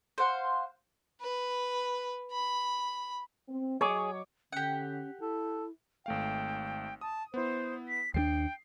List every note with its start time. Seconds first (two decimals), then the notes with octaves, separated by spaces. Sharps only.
0.18 C5 F5 F#5
1.21 B4
2.32 B5
3.48 C4
3.81 F#3 G#4 C#5 D#5 C#6 D6
4.52 D3 C#4 G4 F#5
5.20 E4 A4
6.06 G#1 A3 F5 G5
7.01 A5 D#6
7.34 B3 E4 C5
7.89 B6
8.14 D#2 G3 D4 G5 C7